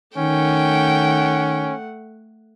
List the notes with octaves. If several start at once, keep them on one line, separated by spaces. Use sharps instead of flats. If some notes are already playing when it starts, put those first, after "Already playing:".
D#3 A3 C#4 F#5 G5